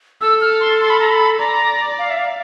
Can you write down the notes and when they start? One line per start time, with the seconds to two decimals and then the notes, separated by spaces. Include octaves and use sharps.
0.21 A4 E6
0.41 F6
0.60 C6
0.80 C6
0.90 B5
1.00 A#5
1.09 B5
1.39 D5 A#5
1.99 F5
2.10 E5
2.18 F5